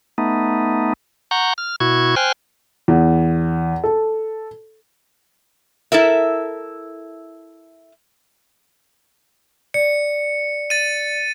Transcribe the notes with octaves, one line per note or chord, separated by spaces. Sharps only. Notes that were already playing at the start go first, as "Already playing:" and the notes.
A3 B3 D#4
F#5 A#5 C#6 G6
F6
B2 E4 F#4 C#6 G#6
C5 G5 G#5 F6 F#6
E2
A4
E4 A4 A#4 E5
D5 C#7
A6 D#7